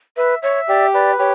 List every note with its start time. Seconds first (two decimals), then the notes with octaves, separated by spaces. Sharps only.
0.17 B4 E5
0.42 C#5 E5
0.68 G4 D5
0.94 B4 D5
1.19 G4 C#5